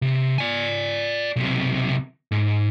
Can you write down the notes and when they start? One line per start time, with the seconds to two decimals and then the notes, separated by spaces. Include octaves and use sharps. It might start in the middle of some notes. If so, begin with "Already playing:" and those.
0.02 C3
0.38 D5 G#5
1.36 B1 C3
2.31 G#2